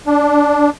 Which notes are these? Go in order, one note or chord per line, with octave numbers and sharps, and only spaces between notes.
D4